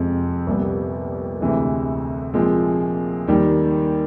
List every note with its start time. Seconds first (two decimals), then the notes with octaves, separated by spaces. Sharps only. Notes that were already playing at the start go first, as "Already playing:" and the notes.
Already playing: F2 C3 F3 G#3 C4
0.47 C2 A#2 G3 B3
1.40 D2 C3 E3 G#3
2.34 A#2 F3 G#3 C4
3.27 D#2 D#3 G3